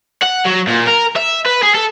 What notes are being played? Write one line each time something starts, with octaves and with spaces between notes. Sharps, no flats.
F#5
F#3
A#2
A#4
E5
B4
G#4
A4